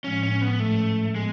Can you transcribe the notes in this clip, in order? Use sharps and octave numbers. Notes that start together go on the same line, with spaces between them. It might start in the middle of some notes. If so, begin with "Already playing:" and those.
A2 F3 G#3 C#4
C#4
B3
G#2 F3 G#3 A3 C#4
F3 G#3 B3